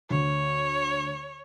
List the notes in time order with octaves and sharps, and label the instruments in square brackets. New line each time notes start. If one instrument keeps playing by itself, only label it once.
[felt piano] D2 [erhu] C#5